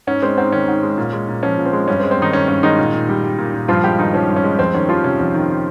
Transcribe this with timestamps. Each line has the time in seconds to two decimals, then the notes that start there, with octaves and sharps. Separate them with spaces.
0.07 G#2 C#4
0.22 G#3 C4
0.38 G#2 C4
0.52 D#3 C#4
0.68 G#2
0.83 G#3
0.98 A#2
1.13 G#3
1.28 A#2
1.43 F3 C#4
1.58 A#2
1.65 C4
1.73 G#3
1.88 G2 C#4
1.99 C4
2.03 G#3
2.11 C4
2.18 G2 D#3 D#4
2.33 D#3 C#4
2.48 G2 C#4
2.63 D#3 G#3 D#4
2.79 A#2
2.93 A#2
3.09 G3
3.24 G3
3.38 A#2
3.54 A#2
3.68 G2 F3 F4
3.84 G3 G#3 G4
3.99 G2 D#3 D#4
4.14 F3 C#4
4.29 G2
4.36 C#4
4.44 G#3
4.59 F2 C4
4.74 D#3 C#4
4.89 F3 G3 F4
5.04 C3 C#4
5.19 F2
5.34 D#3